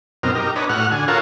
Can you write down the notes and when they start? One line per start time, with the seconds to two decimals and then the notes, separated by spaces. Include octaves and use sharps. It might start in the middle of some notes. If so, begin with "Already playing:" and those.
0.23 F#2 B2 C4 D#4 A#4 F6
0.35 D#4 G4 A#4
0.56 D4 B4 C#5 D#5
0.69 A2 F#4 F#5 F6
0.92 D3 G#5
1.08 F4 F#4 A4 A#4 C#5 F5